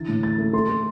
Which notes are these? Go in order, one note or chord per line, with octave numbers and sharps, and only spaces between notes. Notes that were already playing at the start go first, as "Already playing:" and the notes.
Already playing: D3 E3 A6
A2
A3 A6
A3
A3 C6
A3